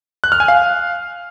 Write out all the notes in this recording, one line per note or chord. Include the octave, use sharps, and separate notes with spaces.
F#6
F6
G#5
F5